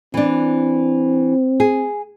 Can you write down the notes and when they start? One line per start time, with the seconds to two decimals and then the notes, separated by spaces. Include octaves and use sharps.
0.14 E3 C4 D4
1.60 G#4